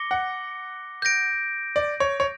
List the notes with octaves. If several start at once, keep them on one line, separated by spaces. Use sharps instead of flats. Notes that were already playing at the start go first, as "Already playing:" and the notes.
Already playing: D6 A#6 C#7 G7
F#5
G6 A#6 D7
D5
C#5
C#5